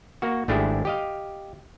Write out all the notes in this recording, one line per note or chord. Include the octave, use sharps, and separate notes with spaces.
A#3 F#4
G#1 A3 D4 E4 G4 G#4
G4 D#5 F5